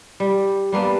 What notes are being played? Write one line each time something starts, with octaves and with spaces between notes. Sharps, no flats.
G3
G3 A#3 B3 D4